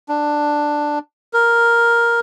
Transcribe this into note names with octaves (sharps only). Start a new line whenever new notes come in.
D4
A#4